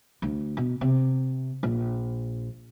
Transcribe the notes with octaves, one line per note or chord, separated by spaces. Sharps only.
D2
B2
C3
A#1